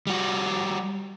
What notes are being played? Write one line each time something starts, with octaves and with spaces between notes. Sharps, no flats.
G3 F#4